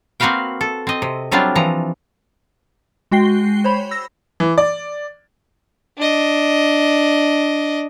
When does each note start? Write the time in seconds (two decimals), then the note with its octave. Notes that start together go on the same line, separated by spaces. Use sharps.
0.20 A#3 C4 F#4 B4 F5 G5
0.61 A4
0.87 C4 D#5
1.02 C3
1.31 C3 F#3 G3 C4 D4 F4
1.55 E3 F3 A#5
3.11 G#3 F#4 G5 C7 G7
3.64 C5 C#5 B5
3.91 E6 A#6
4.40 E3
4.58 D5
5.98 D4 D#5